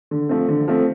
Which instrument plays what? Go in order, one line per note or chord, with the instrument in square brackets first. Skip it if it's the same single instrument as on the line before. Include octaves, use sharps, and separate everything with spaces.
[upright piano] D3
F3 A3 C4
D3
F3 A3 C4